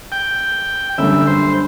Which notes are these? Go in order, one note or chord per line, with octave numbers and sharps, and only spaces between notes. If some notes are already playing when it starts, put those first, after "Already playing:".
G5
G1 F#2 D3 G3 E5
C5